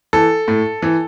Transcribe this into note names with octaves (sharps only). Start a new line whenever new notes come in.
E3 A4
A2
E3